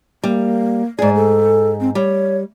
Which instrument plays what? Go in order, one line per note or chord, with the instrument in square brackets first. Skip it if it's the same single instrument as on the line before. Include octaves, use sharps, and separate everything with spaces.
[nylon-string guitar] G3 [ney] A#3
[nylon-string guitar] G#2 G#4 [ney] D5
[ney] A4
C4
[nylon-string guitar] G3 [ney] C#5